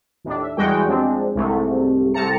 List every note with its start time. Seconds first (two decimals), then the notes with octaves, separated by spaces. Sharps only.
0.24 D#2 A2 D4
0.41 E5
0.57 E2 G3 G#3 F#4 G5
0.88 F3 G#3 C4 D4
1.35 C2 G#2 C3 A3
2.14 C2 C3 A4 A5 A#5 C#7